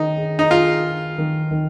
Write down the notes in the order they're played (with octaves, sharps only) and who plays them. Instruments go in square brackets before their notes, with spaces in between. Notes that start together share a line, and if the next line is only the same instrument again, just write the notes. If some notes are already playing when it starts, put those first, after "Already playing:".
Already playing: [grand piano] D#3 C#4 G#4 [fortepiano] D#4
[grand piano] G#4
[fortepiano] D#4
[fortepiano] F4 [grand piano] G#4
[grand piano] G#4
D#3
D#3